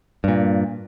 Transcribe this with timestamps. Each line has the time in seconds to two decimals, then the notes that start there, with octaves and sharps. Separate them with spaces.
0.24 G2 A#2